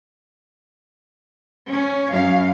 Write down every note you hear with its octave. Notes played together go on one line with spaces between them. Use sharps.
C#4
F#2 F5